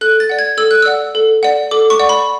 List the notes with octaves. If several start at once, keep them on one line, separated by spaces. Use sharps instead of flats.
A4 F#6
A6
D5 F#5
G#6
A4 E6
F#6
D5 F#5 E6
A4
D5 F#5
A4 D6
C#6
D5 F#5
B5